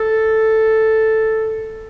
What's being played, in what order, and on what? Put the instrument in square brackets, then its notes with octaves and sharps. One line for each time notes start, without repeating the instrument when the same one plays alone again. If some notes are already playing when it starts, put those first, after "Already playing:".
Already playing: [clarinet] A4